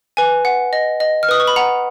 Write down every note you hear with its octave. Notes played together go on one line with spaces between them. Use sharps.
B4 G#5
F#5
D#5
D#5
F6
B4 D#6
C#6
B5
F#5 A#5